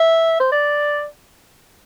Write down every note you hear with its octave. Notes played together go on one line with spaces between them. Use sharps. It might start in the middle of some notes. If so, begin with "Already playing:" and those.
Already playing: E5
C5
D5